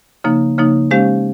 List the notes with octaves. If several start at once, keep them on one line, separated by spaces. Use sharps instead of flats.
C#3 F3 A#3 D#4
C#3 F3 A#3 D#4
G#3 C#4 G4 C5 F5